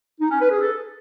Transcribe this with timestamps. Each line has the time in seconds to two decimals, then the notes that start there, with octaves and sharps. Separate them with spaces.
0.20 D#4
0.30 C#4
0.40 B4
0.50 G#4
0.59 A4